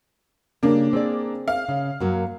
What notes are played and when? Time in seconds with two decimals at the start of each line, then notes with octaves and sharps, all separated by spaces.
0.63 C#3 G3 A#3 D4
0.93 C4 G#4 D5
1.48 F5
1.68 C#3
2.00 F#2 F#3 A#3